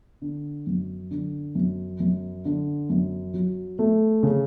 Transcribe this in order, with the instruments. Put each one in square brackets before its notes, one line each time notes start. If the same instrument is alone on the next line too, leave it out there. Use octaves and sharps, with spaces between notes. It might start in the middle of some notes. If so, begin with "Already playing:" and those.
[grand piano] D3
F#2
D3
F#2
F#2
D3
F#2
F#3
A3
C#3